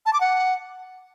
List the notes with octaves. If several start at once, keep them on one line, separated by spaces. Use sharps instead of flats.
A5
D6
F#5